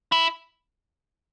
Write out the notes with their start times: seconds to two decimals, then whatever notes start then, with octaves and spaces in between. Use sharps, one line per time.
0.12 E4